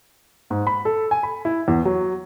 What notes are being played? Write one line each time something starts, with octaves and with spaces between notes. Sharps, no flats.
G#2
B5
A4
G#5
B5
E4
E2
F#3